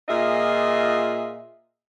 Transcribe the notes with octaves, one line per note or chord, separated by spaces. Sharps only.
A#2 F4 G#4 D#5 E5